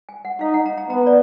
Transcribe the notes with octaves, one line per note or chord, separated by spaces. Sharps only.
G#5
F#5
D#4 F5
F#5
A#5
A#5
B3 A#5
D5